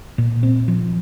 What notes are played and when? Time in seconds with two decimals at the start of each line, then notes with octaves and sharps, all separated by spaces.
0.18 A#2
0.43 C4
0.68 F3